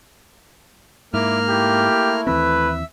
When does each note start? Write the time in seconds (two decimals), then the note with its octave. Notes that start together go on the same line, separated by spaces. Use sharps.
1.14 G#2 A#3 E4 E5 D6 F6
1.49 A3 E4 G4
2.27 D#2 E3 C4 B4 E5